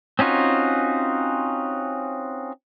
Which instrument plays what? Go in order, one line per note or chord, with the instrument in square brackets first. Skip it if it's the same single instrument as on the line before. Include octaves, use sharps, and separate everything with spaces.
[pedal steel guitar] C4 C#4 D#4 F4 F#4